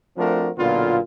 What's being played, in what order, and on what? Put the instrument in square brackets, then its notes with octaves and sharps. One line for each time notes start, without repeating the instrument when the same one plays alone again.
[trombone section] F3 A3 C4 D4 F#4 A#4
B1 A#2 D3 B3 F4